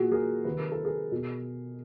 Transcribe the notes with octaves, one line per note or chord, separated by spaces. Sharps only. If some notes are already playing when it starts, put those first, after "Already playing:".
Already playing: A#2 F#4 G#4
G#4 A#4
C3 D#3 B4
A#4
A4
G#4 A#4
B2